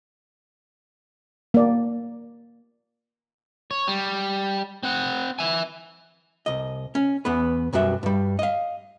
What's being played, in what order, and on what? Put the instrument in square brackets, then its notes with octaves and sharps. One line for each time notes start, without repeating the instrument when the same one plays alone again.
[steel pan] A#3 D5
[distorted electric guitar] C#5
G3
C4 F#5
E5 G#5
[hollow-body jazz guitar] C2 D#5
C#4
E2 B3 B4
B1 F#2 G3 F#4 E5
G2 G3
D#5 F5